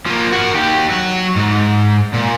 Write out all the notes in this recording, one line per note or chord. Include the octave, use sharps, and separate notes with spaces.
F3 A#3
F#4 A#4
D#2 G4
F#3 F#4
G#2
A#2